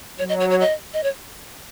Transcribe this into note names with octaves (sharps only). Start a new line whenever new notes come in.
F#3 C#5
D#5
C#5
C#5
D#5
D#5
C#5